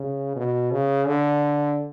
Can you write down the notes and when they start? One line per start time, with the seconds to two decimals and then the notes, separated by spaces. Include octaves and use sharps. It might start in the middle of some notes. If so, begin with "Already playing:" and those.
Already playing: C#3
0.36 B2
0.72 C#3
1.07 D3